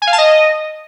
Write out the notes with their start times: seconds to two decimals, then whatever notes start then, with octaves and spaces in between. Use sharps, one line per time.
0.02 G#5
0.07 F5
0.13 A5
0.18 D#5